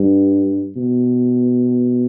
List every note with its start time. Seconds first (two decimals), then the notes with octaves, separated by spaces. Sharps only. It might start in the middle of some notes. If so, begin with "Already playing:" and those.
Already playing: G2
0.77 B2